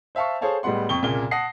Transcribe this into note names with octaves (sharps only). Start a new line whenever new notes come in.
C5 E5 F5 A5 C#6
G#4 A4 C5 C#5 F5 A5
A2 G3 G#3 B3 F#5 C6
F2 G5 C#6 G7
C2 A#2 C#3 A#3 G7
F#5 A5 D#6 A#6 C7